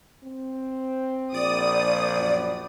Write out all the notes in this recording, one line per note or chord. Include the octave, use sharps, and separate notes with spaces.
C4
A#1 D5 D#6
F#2